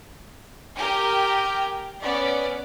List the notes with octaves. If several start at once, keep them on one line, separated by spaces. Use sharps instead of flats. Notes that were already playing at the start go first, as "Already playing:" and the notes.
G4 A#4 G5 G#5
B3 C#4 D5